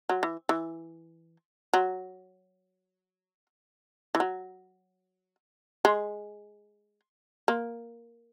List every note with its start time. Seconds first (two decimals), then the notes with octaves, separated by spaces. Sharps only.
0.09 F#3
0.23 E3
0.49 E3
1.73 F#3
4.15 E3
4.20 F#3
5.85 G#3
7.48 A#3